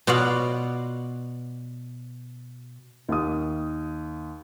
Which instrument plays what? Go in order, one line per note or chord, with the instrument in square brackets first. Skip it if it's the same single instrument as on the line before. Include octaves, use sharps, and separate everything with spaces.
[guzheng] B2 F4 F#4 D5 F5 F#5
[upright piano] D#2 D#6